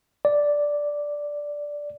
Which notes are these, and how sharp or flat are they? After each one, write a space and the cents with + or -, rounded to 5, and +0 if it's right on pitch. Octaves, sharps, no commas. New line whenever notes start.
D5 -5